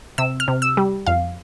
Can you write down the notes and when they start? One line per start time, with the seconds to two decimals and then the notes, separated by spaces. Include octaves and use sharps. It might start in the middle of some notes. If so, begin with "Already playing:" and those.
0.18 C3 E6
0.40 F6
0.48 C3
0.62 E6
0.77 G3
1.06 F2 F5